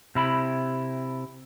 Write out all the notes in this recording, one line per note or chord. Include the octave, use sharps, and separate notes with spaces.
C3 E4 B5